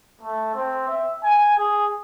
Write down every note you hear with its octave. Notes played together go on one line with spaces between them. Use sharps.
A3
C4
E5
G#5
G#4